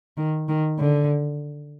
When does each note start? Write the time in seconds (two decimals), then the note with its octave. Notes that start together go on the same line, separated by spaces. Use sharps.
0.17 D#3
0.48 D#3
0.79 D3